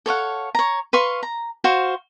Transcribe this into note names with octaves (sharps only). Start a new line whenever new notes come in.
A4 C#5 F5 F#5
C#5 A#5
B4 F5 C6 C#6
A#5
F#4 C5 F5